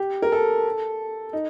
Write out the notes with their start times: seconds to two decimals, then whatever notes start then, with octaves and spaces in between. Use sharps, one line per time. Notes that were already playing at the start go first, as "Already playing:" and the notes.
Already playing: G4
0.22 A#4
0.32 A4
1.33 D#4